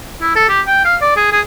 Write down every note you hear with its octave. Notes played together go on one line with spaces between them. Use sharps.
E4
A4
G4
G5
F5
D5
G#4
G#4